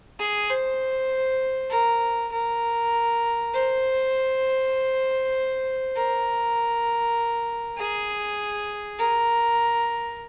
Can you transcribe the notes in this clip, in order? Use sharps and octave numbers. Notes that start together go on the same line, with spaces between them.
G#4
C5
A#4
A#4
C5
A#4
G#4
A#4